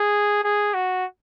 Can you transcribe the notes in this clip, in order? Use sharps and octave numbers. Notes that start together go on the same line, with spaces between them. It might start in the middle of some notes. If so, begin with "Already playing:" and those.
Already playing: G#4
G#4
F#4